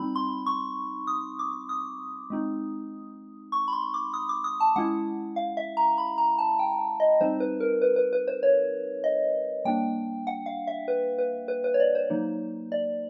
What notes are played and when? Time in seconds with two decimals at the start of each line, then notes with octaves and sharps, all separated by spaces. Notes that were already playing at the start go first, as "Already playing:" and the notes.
Already playing: G3 C4 D#4 B5
0.16 C6
0.46 C#6
1.07 D#6
1.39 D6
1.69 D#6
2.30 G#3 C4 D#4
3.52 C#6
3.68 B5
3.73 C6
3.94 D6
4.14 D#6
4.29 D6
4.44 D#6
4.60 A5
4.76 G#3 C#4 E4 F#5
5.36 F5
5.57 E5
5.77 A#5
5.98 B5
6.18 A#5
6.38 A5
6.59 G5
7.00 D#5
7.21 G3 C4 D#4 C5
7.40 B4
7.60 A#4
7.82 B4
7.96 B4
8.13 B4
8.28 C5
8.43 C#5
9.04 D#5
9.65 G3 A#3 D4 G5
10.27 F#5
10.46 F5
10.67 E5
10.88 B4
11.18 B4
11.48 B4
11.64 B4
11.74 C#5
11.80 D5
11.95 C5
12.10 F#3 A#3 D#4
12.72 D5